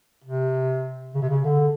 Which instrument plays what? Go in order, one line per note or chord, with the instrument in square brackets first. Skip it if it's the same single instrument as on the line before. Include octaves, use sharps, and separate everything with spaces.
[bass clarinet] C3
C#3
C3
C#3
D3